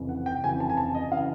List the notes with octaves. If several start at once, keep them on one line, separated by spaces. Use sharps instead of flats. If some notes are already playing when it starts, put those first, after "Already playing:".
Already playing: F1 F2 C#3 E3
F#5
G5
F1 F2 C#3 E3 G#5
A5
G#5
A5
D#5
C#3 E3 F5